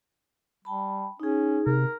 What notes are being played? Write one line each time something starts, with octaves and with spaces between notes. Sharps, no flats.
G3 G5 A5 B5
C#4 D#4 G#4
C3 A#4